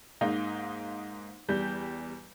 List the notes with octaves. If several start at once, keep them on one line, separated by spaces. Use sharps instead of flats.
G#2 A#3 D#4
E2 G3 G6